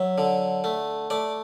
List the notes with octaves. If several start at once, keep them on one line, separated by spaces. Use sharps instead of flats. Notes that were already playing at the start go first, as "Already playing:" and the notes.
Already playing: F#3 E5
D3
A3
A3 D5